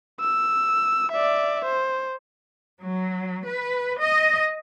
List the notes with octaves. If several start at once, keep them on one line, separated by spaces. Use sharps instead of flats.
E6
D5 E5
C5
F#3
B4
D#5